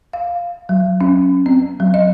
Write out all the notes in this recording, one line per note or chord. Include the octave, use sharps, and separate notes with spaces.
F5
F#3
C#4
C4
F#3
D#5